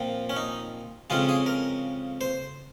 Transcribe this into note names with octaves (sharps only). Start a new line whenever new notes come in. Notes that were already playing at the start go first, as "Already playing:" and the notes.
Already playing: A#2 F3 C4
C#4
D#4
F2 C#3 G#3 C#4 F4
G#4
A#4
C5